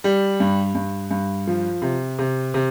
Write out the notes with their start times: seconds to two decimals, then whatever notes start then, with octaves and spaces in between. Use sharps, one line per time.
0.04 G3
0.40 G2
0.75 G2
1.11 G2
1.47 F3
1.82 C3
2.19 C3
2.54 C3